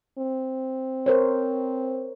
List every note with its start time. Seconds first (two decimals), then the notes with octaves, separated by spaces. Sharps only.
0.18 C4
1.06 A#4 C5 C#5